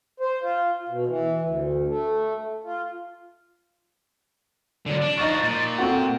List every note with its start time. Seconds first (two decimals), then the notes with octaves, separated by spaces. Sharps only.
0.20 C5
0.42 F4
0.89 B2
1.07 E3
1.42 D2
1.86 A3
2.64 F4
4.86 D3 F#3 D5
5.02 D4
5.17 F3 D#4 F#4 C#6 A6
5.44 A#2
5.78 A3 C4 F#4 G5